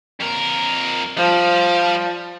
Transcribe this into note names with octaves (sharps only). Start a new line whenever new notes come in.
F2 A#4
F3 G3